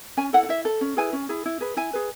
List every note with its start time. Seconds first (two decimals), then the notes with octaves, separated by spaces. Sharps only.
0.17 C#4 G#5
0.33 E4 A4 F#5
0.43 F#5
0.49 E4 E5
0.65 A4
0.81 C#4
0.97 E4 G#4 B4 G#5
1.13 C#4
1.29 E4 G#4
1.46 E4
1.61 G#4 B4
1.77 E4 G#5
1.93 G#4 B4